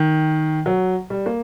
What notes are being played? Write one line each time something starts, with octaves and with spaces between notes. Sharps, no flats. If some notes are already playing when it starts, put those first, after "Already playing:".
Already playing: D#3
F#3
G3
A#3